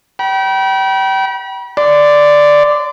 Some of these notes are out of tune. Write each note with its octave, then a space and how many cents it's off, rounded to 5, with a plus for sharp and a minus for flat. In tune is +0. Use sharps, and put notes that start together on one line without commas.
G5 -30 B5 -35
D5 +0 C6 -30